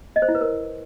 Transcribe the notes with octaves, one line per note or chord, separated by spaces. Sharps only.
D#5
C5
E4
B4
A#4